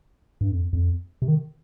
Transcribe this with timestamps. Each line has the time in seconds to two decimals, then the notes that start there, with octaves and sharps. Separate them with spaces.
0.41 G2
0.51 F2
0.73 F2
1.22 C3
1.28 D#3